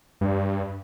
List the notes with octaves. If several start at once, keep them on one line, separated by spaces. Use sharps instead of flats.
G2